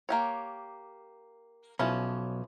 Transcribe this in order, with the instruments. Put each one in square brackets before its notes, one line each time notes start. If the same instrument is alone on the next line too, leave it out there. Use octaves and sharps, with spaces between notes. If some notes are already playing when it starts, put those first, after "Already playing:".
[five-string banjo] A#3 G4 C#5
[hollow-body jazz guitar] B1 B2 [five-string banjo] E3 F3 C#4